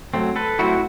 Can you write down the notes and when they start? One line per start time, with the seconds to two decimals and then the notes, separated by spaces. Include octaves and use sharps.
0.14 F#3 A3 C4
0.36 A4 B4
0.59 F#3 A3 C4 E4 F#4